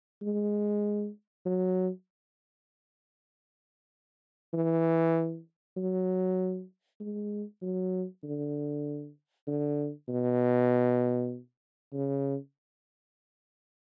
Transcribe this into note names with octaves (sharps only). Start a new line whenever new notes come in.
G#3
F#3
E3
F#3
G#3
F#3
D3
D3
B2
C#3